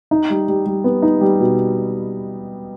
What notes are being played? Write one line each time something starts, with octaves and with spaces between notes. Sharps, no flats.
D#4
G3
G3
G3
B3
D#4
G3
B2